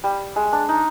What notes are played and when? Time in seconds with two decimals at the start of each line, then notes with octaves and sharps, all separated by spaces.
0.04 G3
0.36 G#3
0.53 D4
0.69 D#4